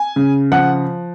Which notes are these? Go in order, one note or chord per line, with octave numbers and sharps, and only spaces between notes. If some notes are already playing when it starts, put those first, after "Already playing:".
Already playing: G#5
C#3
F3 F#5